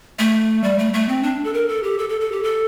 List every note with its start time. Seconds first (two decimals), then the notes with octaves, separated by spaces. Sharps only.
0.19 A3
0.64 G3
0.79 A3
0.94 A3
1.09 C4
1.23 D4
1.44 A4
1.54 A#4
1.68 A4
1.83 G4
1.98 A4
2.09 A4
2.21 A4
2.32 G4
2.43 A4